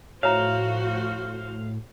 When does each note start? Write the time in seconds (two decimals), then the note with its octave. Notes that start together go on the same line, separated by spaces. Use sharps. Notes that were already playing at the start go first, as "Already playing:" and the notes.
0.23 A2 F3 F#4 C5 C#5 E5 F5 A#5